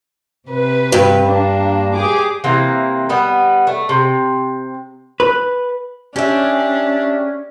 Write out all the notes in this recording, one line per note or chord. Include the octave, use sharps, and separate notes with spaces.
C3 B4
G2
A#3 D4
G4 G#4 D6
C3 E3 A#3
G3 B3
A3
C3
B4
C#4 D4 G4 E5